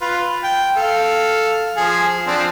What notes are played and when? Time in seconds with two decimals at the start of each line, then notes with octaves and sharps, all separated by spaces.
0.01 F4 B4
0.44 G5
0.76 A4 F5
1.76 F3 G#4
2.27 F3 C4 D4